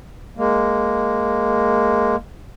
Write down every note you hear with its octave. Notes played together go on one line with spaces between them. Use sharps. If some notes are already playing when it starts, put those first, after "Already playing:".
G#3 A#3